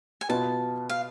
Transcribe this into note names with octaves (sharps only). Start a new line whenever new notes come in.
G#5
B2 B3 F4 A5
F5